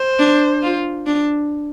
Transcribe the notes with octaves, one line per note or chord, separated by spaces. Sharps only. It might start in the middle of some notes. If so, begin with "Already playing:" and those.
Already playing: C5
D4
F4
D4